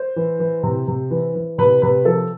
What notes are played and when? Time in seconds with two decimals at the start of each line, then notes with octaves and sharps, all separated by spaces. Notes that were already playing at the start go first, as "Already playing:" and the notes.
Already playing: C5
0.16 E3
0.40 E3
0.63 C3
0.88 C3
1.11 E3
1.35 E3
1.58 C3 B4
1.82 C3 B4
2.05 F3 A4